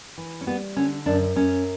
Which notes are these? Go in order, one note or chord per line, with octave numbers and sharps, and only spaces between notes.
E3
C#4
G3 B3
D3 C#4
F#2 D4
F#2 C#4